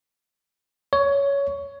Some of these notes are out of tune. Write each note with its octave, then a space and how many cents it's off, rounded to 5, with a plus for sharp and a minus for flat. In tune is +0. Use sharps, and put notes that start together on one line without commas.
C#5 +15